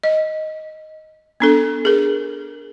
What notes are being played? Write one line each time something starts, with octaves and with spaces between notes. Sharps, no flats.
D#5
B3 D4 A4
G#4 A#4